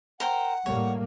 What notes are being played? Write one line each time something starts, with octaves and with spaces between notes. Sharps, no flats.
A#4 C5 F#5 G5
A2 G3 A#3 C#5